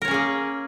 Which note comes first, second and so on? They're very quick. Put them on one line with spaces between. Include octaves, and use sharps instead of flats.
A#4 C#5 C#4 G#4 A#3